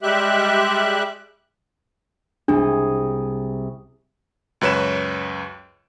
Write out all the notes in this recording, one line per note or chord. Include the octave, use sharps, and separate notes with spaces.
G3 G#3 G4 E5 F#6
C2 G#3 D4 G#4
C#2 F#2 B4 C#5 E7